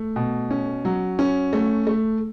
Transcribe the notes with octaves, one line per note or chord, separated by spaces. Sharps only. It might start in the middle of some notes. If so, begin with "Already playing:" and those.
Already playing: A3
B2
C#4
F#3
C#4
A3
A3